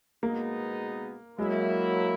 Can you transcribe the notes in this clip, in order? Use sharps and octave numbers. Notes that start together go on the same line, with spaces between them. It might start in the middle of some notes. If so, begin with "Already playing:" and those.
B2 G#3 A#3 B3 D#4
F#3 G#3 A#3 E4